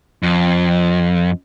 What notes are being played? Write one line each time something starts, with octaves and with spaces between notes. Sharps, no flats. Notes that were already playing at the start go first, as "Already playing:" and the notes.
F2